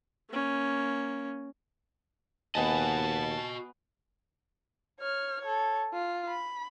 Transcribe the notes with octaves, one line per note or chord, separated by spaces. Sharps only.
A#3 C#4
D#2 B3 F#4 D#5 G#5 A5
C#5 F6
A4 C#5
F4
B5